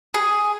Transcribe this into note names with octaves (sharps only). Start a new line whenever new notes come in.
G#4